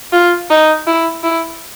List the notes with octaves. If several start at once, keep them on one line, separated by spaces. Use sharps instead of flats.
F4
D#4
E4
E4